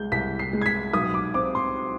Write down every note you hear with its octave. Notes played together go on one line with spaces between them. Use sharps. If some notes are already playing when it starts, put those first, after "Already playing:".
Already playing: C2 G#3 G6
C2 B6
C7
G#3
G#6
B6
B1 D#6
D6
C4 D6
C6